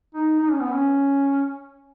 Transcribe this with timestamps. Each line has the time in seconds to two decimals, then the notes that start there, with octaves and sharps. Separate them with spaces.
0.14 D#4
0.39 D#4
0.51 C#4
0.61 B3
0.71 C#4